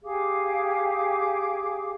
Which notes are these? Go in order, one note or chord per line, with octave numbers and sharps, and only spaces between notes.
G4 G#4 F5 D6